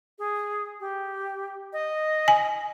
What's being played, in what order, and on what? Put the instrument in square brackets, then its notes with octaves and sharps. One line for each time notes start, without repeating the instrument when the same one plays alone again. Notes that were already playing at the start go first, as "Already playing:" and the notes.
[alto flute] G#4
G4
D#5
[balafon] G#5